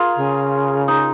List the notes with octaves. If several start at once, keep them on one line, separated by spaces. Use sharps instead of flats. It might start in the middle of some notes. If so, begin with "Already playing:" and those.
Already playing: F4 G#4 A#4
C#3
D#4